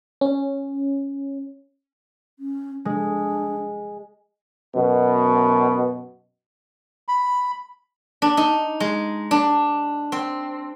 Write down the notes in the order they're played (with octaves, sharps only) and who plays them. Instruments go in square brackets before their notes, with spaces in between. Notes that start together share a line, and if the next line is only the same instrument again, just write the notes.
[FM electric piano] C#4
[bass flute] C#4
[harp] G#3 [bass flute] D4
[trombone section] F#2 B2
[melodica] B5
[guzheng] D4
D#4
G#3
D4
C4